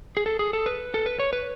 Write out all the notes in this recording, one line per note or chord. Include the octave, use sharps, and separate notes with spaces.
G#4
A4
G#4
A4
B4
A4
B4
C#5
B4